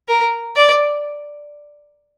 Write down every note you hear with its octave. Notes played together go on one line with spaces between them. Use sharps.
A#4
D5